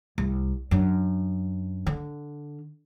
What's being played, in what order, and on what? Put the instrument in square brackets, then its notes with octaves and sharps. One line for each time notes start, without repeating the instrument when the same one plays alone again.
[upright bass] C2
F#2 D4
D3